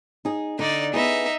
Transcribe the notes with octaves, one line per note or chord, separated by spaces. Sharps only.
D#4 G#4
D3 D#4 D5
B3 D#4 E4 G#4 E5